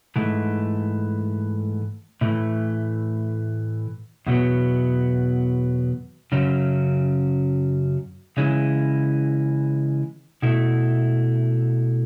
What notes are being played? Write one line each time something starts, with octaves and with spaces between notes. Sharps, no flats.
G#2 E3 A3
A2 E3 A3
E2 B2 F#3 B3
F#2 C#3 F#3 C#4
C#3 E3 G#3 C#4 E4
B2 A3 E4